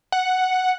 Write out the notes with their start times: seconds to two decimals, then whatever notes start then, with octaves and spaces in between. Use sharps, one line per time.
0.12 F#5